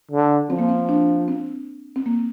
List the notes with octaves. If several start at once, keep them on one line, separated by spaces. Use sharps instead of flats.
D3
F3 C4
A#3
C4
D4
C4
C4
A#3